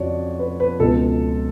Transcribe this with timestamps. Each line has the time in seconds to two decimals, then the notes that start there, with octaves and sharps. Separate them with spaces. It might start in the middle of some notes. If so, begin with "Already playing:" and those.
Already playing: F2 C#3 F#4 C#5 D5
0.39 B4
0.60 B4
0.80 C#2 B2 A4